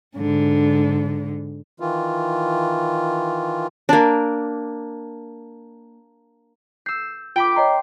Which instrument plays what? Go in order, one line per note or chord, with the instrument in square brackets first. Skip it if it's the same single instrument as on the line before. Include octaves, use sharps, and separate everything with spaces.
[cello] G#2 D3
[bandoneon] D#3 E3 F4
[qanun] A#3 D4
[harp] E6 C7 [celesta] G6
[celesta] F4 D7 [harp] G5 B5 D6
[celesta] C#5 D#5 A#5 [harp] C6